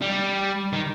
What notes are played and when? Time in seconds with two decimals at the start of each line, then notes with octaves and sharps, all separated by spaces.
0.02 G3
0.73 D#3